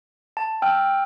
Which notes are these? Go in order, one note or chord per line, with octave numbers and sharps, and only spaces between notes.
A5
G5 E6 F6